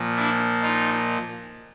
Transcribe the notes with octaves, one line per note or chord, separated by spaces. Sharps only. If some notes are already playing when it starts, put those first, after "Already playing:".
Already playing: A#2 F3
D4 E4
D#4 F4